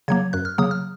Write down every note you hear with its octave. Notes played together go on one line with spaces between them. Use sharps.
C#3 F#3 A#3 G#6
F#2 F#6
F6
C#3 F#3 A#3 D#6
F6